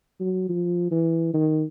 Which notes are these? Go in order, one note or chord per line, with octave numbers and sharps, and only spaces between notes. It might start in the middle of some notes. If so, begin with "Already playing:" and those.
F#3
F3
E3
D#3